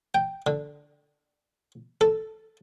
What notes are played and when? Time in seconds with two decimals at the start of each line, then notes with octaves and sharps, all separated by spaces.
0.15 G5
0.47 D3
2.01 A4